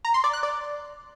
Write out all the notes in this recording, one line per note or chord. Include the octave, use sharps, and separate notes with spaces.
A#5
C6
D5
F#6
D5